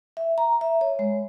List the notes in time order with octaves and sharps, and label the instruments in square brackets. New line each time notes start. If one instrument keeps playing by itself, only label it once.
[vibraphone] E5
A#5
E5
C#5
G#3